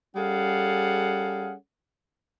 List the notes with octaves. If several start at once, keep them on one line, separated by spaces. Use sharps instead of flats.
G3 C#4 G#4 A4 F5 F#5